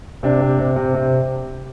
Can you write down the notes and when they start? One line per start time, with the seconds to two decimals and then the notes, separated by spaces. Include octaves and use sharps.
0.23 C3 D4
0.40 C3
0.59 C3
0.76 C3
0.94 C3